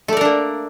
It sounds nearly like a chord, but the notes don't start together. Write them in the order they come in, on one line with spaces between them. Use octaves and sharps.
A3 D5 A#4 D4 A#3